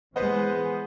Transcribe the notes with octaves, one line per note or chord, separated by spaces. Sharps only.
E3 G#3 B3 B4 C5 D#5